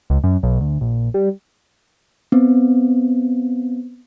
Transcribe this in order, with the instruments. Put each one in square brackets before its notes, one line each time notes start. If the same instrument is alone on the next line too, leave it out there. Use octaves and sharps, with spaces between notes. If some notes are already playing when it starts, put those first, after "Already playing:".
[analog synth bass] C#2
F#2
B1
D2
A#1
G3
[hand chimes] B3 C4